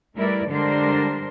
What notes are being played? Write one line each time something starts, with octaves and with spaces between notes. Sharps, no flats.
G3 A3 E4 A#4 B4 D5
D3 G3 G#3 D4 A#4 C5